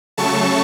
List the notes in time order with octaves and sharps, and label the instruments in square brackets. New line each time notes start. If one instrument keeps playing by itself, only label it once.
[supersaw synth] C#3 F#3 A3 A5 C#6